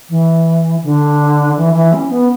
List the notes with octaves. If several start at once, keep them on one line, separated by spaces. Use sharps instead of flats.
E3
D3
E3
E3
C#4
B3